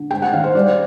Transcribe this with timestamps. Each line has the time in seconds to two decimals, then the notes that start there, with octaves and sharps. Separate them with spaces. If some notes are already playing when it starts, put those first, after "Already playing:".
Already playing: D3
0.11 G#2 G5
0.22 F#5
0.33 D#3 F5
0.44 C5
0.55 G3 D5